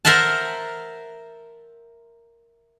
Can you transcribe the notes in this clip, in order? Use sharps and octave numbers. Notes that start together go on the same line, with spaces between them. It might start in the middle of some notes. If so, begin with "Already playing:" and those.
A#4 C5 E5 F#5 A5